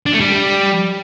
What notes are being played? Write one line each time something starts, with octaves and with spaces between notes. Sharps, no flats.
D4
A3
G3